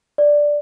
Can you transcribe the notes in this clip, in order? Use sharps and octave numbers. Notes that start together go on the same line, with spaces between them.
D5